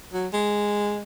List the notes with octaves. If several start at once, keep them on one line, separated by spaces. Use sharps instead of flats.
F#3
G#3